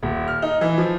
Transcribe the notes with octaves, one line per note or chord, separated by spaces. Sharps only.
D#1
F6
D#4
E3
F3